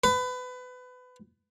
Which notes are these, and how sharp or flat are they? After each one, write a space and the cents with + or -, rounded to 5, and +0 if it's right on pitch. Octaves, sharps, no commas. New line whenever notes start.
B4 +25